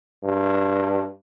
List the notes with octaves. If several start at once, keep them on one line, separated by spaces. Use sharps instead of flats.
G2